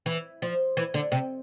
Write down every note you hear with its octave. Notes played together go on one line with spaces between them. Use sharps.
E3
F3
E3
D3
C3